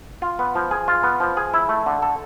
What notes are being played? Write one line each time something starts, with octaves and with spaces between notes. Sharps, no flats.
F4
B3
F3
G#4
F4
B3
F3
G#4
E4
A3
D3
A4